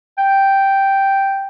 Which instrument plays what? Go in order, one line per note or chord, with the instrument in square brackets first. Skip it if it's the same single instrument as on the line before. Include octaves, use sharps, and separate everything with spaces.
[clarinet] G5